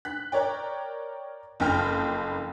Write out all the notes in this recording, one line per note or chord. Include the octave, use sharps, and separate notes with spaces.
F#6 B6
A#4 C#5 D5 G5
F#1 F2 G5 F6 G6